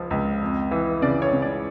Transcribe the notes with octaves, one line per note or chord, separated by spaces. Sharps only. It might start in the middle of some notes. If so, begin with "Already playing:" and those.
Already playing: C#2 F3
C#2
F2
E3
C#3 D5
C#5
C#3
D5